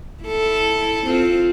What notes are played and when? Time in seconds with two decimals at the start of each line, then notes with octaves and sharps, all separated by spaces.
0.24 E4 A4
1.06 C4 F4